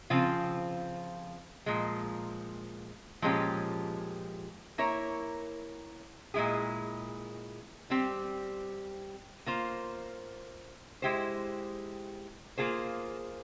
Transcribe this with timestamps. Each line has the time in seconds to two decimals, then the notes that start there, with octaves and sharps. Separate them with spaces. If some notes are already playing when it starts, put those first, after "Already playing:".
0.10 C#3 F3 C4 F4
1.66 A#2 F3 G#3
3.22 A#2 F3 G#3 C#4 G4
4.78 A#3 E4 A#4 C#5
6.34 A#2 G#3 E4 G#4
7.90 G3 C4 G4
9.46 A#3 F4 C5
11.02 G#3 E4 G4 C5
12.58 A#3 F4 G#4 C5